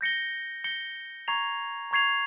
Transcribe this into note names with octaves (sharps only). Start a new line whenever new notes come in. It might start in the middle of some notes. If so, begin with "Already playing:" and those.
G6 A#6 C#7 G7
G6 A#6 C#7 G7
A#5 C#6 G#6 C7 F7
A#5 C#6 G#6 C7 F7